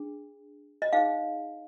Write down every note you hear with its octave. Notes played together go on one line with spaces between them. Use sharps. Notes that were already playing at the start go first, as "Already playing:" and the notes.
Already playing: D4 G#4
D#5
D#4 G#4 C5 F5